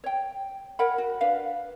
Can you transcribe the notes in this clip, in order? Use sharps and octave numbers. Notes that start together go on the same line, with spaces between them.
C#5 G5
A#4 C#5 F#5 B5
F#4
D4 B4 F5 F#5